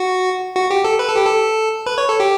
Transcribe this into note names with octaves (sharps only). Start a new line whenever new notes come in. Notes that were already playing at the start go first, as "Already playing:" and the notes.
Already playing: F#4
F#4
G4
A4
B4
A4
G4
A4
B4
C#5
A4
G4